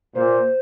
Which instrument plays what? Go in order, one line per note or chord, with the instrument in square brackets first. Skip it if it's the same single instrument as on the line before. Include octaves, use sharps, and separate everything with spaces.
[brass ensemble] A#2 [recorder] C5